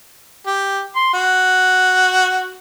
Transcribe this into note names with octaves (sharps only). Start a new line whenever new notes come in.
G4
C6
F#4